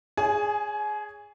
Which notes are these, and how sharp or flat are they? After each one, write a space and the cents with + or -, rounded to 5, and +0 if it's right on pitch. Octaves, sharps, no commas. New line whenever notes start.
G#4 -5 C#5 +40 G#5 +30